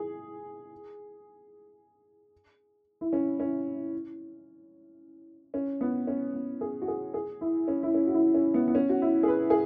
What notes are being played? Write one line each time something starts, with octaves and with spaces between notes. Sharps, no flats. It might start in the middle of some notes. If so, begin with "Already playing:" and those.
Already playing: G#4
E4
C#4
C#4
C#4
B3
C#4
B3
G#4
F#4
G#4
G#4
E4
C#4
E4
C#4
F#4
E4
C#4
B3
B3
C#4
F#4
E4
G#4
B4
G#4